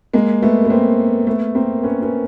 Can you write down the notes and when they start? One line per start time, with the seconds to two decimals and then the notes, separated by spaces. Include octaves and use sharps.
0.14 G#3 A#3
0.42 A3 B3
0.65 B3
0.70 A#3 C4
1.27 A3 B3
1.55 A#3 C4
1.83 B3 C#4
2.02 B3 C#4